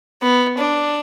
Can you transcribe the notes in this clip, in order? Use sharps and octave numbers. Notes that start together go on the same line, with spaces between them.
B3
D4